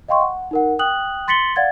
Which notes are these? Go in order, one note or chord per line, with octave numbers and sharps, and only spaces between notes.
D#5 F5 G5 C6 C#6
F#5
D#4 A#4 F#5
G5 D#6 F#6 F#7
C6 A6 B6 C#7 F#7 G7
D5 F5 F#5 G#6 A6